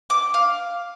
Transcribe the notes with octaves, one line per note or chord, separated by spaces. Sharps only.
D6
F5